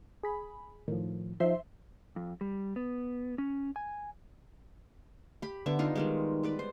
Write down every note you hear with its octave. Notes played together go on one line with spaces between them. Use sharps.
G#4 B5
A2 D#3 F3
F3 D#4 C5 E5 C6
F2
G3
B3
C#4
G#5
G4 B5
D3 B3 E5
D4 D#4 F4
D#3 G3 G#3
B3 B4 D5
C5